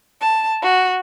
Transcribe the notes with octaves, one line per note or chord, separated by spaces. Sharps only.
A5
F#4